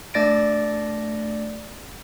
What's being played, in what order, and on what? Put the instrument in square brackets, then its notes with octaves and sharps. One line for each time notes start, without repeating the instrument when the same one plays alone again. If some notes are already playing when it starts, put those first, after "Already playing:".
[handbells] A3 D4 D5 A6 A#6 D7